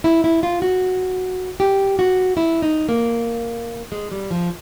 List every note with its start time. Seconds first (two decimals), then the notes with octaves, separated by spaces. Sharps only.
0.04 E4
0.24 E4
0.43 F4
0.62 F#4
1.60 G4
1.99 F#4
2.37 E4
2.62 D#4
2.89 A#3
3.92 G#3
4.12 G3
4.31 F3